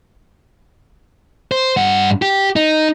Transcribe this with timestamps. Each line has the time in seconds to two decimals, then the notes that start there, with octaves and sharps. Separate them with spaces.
1.52 C5
1.77 G2 F#5
2.22 G4
2.56 D#4